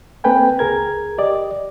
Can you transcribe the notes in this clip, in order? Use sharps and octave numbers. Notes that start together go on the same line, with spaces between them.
A#3 C4 A4 B4 G5 G#5
C#2 G#4 A#4 G#6
G4 D5 D#5